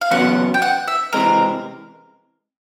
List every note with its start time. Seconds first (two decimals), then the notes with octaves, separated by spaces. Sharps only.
0.01 F5
0.11 E2 C#3 F#3 B3 F#5
0.54 G5
0.62 F#5
0.88 E5
1.13 C#2 C3 E3 G#3 C4 A#4